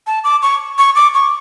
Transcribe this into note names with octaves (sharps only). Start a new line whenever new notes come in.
A5
D6
C#6
C#6
D6
C#6